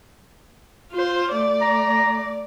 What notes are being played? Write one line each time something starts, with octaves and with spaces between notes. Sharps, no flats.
F4 C5
A3 D5
A#5